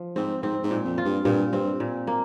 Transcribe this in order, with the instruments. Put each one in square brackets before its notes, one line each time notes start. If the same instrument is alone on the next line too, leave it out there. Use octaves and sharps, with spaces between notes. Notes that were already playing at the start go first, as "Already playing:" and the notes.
Already playing: [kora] F3
[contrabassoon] G#2 [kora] C4
[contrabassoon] G#2 [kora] C4
[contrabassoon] G#2
[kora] A#2
[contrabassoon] F2
[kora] F4
[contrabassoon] G2
[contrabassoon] G2 [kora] A#2
[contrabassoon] G2 [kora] C4
[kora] A#2
A#3